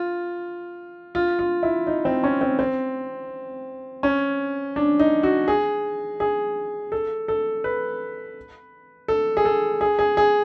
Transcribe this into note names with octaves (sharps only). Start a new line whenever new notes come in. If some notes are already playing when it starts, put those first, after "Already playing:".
Already playing: F4
F4
F4
E4
D#4
C4
C#4
C4
C4
C#4
D4
D#4
F#4
G#4
G#4
A4
A4
B4
A4
G#4
A4
G#4
G#4
G#4